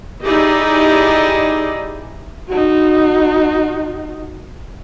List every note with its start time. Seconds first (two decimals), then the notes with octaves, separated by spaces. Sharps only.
0.24 D#4 E4 G4 G#4 D5 D#5
2.48 D#4 F#4